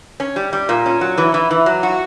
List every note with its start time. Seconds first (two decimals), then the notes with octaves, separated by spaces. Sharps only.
0.20 C#4
0.36 G3
0.53 G3
0.69 A#2
0.86 C#4
1.01 F#3
1.18 E3
1.34 E3
1.51 E3
1.66 F#3
1.83 F#4